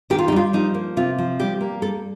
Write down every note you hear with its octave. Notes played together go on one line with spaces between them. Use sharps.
D#3 G4
F4
D#4
G3 F4
F3 D#4
A#3
C3 F4
F3
G3 G4
A#3
G3 A4